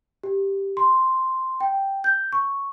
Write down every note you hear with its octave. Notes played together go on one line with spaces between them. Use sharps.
G4
C6
G5
G6
C#6